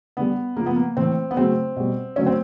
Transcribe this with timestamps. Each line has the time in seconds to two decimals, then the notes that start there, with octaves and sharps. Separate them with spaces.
0.17 D3 G3 B3
0.56 C#3 F3 G#3 A#3
0.66 B3
0.76 A#3
0.97 A2 E3 A3 C4
1.31 B3
1.37 C#3 F#3 A3 C4
1.76 B2 G3
2.16 D3 F#3 A3 C#4
2.26 C4